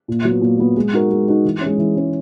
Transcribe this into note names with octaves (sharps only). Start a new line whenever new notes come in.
A#2
F#3 B3
A#2
F#3 B3
G#3
D#4 F#4 A#4
G#3
D#4 F#4 A#4
E3
C#4
G#3
E3
G#3 C#4